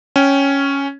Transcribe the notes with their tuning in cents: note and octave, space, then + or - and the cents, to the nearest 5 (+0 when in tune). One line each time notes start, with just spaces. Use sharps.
C#4 +0 G5 +0